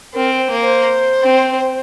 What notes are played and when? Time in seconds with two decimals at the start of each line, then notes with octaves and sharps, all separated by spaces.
0.14 C4 A#4
0.38 C5
0.50 A#3
0.62 C5
1.22 C4